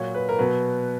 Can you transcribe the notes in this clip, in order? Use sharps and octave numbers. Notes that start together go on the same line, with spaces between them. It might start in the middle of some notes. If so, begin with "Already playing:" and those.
Already playing: A#2 F#3 C#5
B4
A#4
B2 F#3 B4